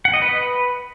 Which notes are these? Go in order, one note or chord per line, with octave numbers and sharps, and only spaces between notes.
F#5
D#5
B4